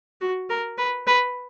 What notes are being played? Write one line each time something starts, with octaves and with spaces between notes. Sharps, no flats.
F#4
A#4
B4
B4